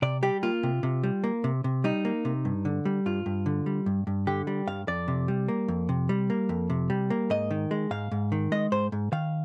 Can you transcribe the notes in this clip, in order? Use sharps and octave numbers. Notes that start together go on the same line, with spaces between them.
C3 D5
G3 G4
A#3 F4
C3
C3
G3
A#3
C3
C3
G3 D#4
A#3
C3
G2
D3
G3
G2 F4
G2
D3
G3
G2
G2
D3 G4
G3
G2 F5
F2 D5
C3
G3
A#3
F2
C3
G3
A#3
F2
C3
G3
A#3
G#2 D#5
D#3
G#3
G#2 F5
G#2
D#3
G#3 D#5
G#2 C5
G#2
D#3 F5